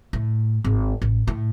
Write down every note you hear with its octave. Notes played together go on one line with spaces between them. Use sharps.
A2
G#1
A1
A2